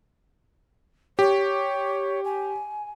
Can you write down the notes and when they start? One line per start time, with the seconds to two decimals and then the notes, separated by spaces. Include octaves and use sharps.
1.19 G4 C#5
2.25 G#5